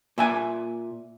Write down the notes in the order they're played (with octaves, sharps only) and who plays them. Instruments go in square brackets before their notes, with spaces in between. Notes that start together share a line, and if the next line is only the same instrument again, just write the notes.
[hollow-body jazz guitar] A#2 E5 G#5